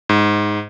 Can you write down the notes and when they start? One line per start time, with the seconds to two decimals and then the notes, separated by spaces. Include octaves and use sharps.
0.09 G#2